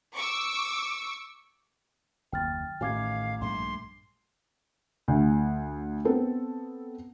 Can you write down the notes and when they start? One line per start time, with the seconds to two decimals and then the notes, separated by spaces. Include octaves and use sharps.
0.15 C#6 D6 E6
2.33 F#1 D#2 G5 F6 A6
2.81 A1 A2 D#3 F5 G#5 D6 G#6
3.41 A#1 G2 A3 C6
5.08 D2
6.05 B3 C4 A4